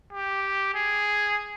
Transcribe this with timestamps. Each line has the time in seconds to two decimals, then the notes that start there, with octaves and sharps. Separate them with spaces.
0.13 G4
0.74 G#4